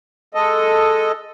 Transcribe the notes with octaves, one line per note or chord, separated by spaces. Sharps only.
G#3 A4 D#5